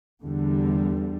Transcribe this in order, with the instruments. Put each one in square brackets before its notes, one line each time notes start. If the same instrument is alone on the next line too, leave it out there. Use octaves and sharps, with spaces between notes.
[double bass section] E2 D3 G3